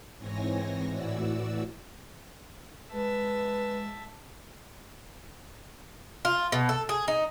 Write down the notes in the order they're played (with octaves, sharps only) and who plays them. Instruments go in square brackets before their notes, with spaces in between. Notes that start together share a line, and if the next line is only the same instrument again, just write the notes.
[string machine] G#2 E3 C4 C#5 G#5 A#6
A2 E3 F#4 D5 E6
[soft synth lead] G#3 [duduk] B4 [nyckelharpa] E5 A5
[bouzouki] F4
B2
A4
G#4
D#4